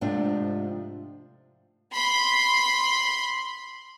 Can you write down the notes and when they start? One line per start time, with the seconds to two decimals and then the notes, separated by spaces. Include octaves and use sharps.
0.01 G#2 C3 F3 A3 D4
1.94 B5 C6